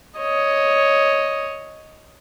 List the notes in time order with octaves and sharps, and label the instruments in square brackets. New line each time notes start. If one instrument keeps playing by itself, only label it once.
[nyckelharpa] C#5 D#5